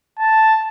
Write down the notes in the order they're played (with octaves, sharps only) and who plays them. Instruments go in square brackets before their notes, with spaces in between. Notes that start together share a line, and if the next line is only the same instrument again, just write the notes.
[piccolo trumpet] A5